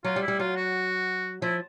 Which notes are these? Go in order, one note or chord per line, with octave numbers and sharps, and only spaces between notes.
F#3 F4
G3
E4
G3
F#3 F4
F#4
F3 E4